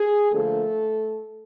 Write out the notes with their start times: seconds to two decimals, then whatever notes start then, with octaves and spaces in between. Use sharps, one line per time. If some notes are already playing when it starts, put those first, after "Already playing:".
Already playing: G#4
0.32 D3 F3 A3 A#3 D4 A4